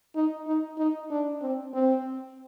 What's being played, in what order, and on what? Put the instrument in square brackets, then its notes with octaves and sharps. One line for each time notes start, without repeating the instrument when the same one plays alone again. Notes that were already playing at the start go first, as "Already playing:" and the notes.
[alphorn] D#4
D#4
D#4
D4
C4
C4